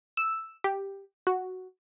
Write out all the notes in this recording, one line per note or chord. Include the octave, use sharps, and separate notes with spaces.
E6
G4
F#4